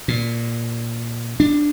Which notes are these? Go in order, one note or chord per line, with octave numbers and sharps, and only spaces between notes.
A#2
D4